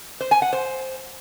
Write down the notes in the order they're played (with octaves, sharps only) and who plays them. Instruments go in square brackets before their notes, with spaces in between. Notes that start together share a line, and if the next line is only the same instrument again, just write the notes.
[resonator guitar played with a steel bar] C5
G#5
F#5
C5